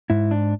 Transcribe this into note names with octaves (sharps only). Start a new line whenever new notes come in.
G#2 E4
D4